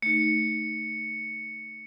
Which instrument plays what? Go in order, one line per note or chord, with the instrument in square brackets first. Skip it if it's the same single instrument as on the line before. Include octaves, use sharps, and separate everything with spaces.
[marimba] A3 D#4 [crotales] C#7